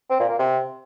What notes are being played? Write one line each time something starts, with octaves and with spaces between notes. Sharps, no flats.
C4
A#2
A#3
C3